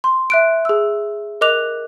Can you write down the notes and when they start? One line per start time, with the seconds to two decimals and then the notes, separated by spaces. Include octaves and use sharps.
0.04 C6
0.30 E5 F#6 D7
0.65 G#4 E6
1.41 A#4 D#5 D6 F#6 F7